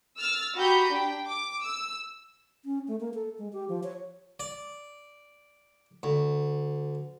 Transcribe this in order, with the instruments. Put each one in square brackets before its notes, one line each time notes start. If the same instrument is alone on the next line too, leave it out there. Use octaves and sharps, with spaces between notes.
[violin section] E6 F6 A6
F#4 G4 A#5 B5 D#6 G6
D4 G5
D6
E6
[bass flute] C#4
A3
A#3
A4
G#3
G4
F3
C#5
[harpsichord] D5
D2